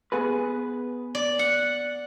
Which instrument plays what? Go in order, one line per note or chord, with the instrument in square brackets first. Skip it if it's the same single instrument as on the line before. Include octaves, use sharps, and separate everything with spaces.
[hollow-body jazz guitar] B3 G#4 B4
[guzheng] D5
F#5